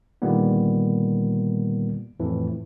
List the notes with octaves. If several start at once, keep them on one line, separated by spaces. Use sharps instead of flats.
A#2 D3 D#3 G3 A#3 B3
F2 A2 E3 A3